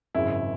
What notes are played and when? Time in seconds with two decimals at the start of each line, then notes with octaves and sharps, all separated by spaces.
0.14 G#1 F#2 C#3 E4